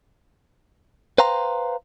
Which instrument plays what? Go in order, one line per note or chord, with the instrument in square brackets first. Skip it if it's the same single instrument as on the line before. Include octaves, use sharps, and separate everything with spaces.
[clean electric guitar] B4 C5 F5 G5 A#5 C6